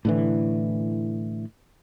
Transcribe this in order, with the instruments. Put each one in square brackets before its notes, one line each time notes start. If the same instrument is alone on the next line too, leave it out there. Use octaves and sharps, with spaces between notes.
[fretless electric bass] A2 D3 E3